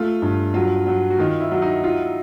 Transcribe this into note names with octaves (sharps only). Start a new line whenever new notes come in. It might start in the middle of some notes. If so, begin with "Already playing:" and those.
Already playing: A3 F4
G2
F#3 F4
F#3
F#4
D#3 F4
E4
F#3
D#4
F4